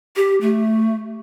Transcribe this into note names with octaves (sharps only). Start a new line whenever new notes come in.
G4
A3